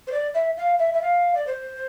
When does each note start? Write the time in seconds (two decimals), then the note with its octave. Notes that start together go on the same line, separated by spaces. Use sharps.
0.07 C5
0.12 D5
0.34 E5
0.57 F5
0.79 E5
0.94 E5
1.01 F5
1.35 D5
1.47 C5